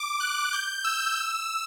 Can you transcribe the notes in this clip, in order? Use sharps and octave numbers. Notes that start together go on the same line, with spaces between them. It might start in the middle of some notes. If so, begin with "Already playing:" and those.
Already playing: D6
F#6
G6
E6
E6